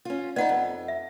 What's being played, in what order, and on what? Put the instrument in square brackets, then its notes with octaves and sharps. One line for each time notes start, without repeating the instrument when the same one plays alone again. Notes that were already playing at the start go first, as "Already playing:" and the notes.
[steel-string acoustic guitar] C#4 F4
[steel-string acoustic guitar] B3 D#4 B4 [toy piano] D5 F#5
[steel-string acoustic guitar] F2
[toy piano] E5